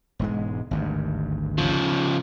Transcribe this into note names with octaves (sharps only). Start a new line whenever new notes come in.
E1 G#2 G#3
G#1 D2 G2
C#3 F3